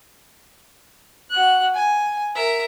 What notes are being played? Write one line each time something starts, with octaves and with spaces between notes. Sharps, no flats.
F#4 F#6
G#5
A#4 E5